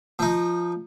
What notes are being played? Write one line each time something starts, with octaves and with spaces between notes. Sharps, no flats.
F3 D#4